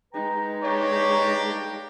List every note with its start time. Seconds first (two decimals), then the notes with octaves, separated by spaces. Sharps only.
0.14 G#3 D#4 B4 G5 A#5
0.63 A#3 D4 G4 C#5